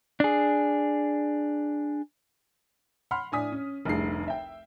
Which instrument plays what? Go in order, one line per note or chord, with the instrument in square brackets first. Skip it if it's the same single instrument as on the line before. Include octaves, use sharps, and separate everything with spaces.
[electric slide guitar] D4 G#4
[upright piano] F#5 B5 C6 F6
A2 D4 G#5 D#6 B6
C#4
F1 C2 D3 G#4 C7
E5 G5